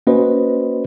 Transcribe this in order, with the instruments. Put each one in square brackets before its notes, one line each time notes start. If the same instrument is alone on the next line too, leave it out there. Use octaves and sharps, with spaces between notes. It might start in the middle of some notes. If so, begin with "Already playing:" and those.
[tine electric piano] A#3 C#4 F#4 B4 C5 D#5